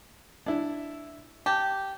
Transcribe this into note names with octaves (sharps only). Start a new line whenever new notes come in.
D4 E4
G4 A5